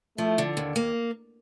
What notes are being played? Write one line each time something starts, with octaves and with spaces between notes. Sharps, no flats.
F3 A3
D3
D#2
A#3